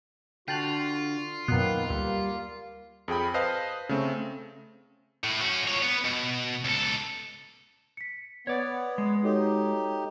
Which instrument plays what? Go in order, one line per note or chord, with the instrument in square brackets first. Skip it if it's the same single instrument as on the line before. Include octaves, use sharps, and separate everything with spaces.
[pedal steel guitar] D3 [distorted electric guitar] F4 [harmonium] F#4 [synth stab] G5 A5 F#6
[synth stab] F#2 B2 [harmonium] D#3 A#3 B3 [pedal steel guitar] F#6
[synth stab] D2 [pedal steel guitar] G3 [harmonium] A#3
[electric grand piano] F2 G#4 G5 B5
B4 C5 D#5 F5 A5
C#3 A3 C4
[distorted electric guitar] A2
C#4 F#4
F4 C#5
B3
B2
C#2 A4
[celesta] B6 C#7
[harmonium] B3 [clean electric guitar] C#5 D5 [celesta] G#6
[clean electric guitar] G#3
[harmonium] D#4 G4 [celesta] F#4 A4 C#5